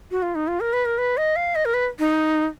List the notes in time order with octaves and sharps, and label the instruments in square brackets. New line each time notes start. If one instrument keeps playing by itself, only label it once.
[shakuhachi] F#4
F4
D#4
F4
A#4
B4
A#4
B4
D#5
F5
D#5
A#4
B4
D#4